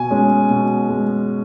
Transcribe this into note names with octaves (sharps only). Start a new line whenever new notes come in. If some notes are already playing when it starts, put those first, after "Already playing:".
Already playing: B2 G#5
G#3 C#4
B2
G#3